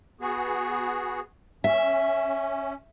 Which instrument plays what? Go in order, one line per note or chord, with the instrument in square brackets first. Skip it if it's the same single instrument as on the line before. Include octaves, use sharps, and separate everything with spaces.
[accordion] B3 F#4 G#4
[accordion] C#4 [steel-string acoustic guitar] E5